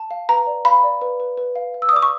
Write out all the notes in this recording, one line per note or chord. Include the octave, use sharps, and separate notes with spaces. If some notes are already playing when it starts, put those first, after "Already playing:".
Already playing: A5
F5
B4 A#5
D5
F5 B5
D5
B4
B4
B4
F5
F5
E6
D#6
D5 D6
C#6